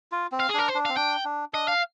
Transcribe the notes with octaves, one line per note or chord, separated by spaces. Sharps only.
F4
C4
F5
G#4
D4 A#4
C5
D4
C4 F5
D4 G5
D4
D4 D#5
F5